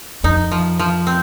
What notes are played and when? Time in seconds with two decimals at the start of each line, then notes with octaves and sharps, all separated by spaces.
0.24 F2 D#4
0.52 F3
0.79 F3
1.07 C4